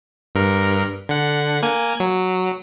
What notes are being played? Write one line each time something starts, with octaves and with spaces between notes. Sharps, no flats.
G2 A#4
D3 F#5
A#3 G#5 G#6
F#3